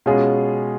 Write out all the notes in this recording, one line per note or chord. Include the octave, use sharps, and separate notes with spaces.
B2 G#3 C#4 F4 G#4